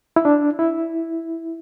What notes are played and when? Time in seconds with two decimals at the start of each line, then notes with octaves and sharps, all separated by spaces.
0.16 E4
0.25 D4
0.59 E4